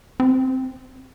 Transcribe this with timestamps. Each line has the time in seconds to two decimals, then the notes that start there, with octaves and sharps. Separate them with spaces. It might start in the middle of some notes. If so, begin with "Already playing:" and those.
0.20 C4